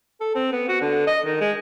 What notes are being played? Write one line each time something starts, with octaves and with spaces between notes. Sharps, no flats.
A4
C4
B3
F#4
D3
D#5
D#3
G#3